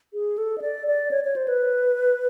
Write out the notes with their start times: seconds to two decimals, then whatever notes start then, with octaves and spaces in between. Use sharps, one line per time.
0.14 G#4
0.38 A4
0.58 D#5
0.62 D5
0.87 D5
1.11 C#5
1.24 C#5
1.36 C5
1.48 B4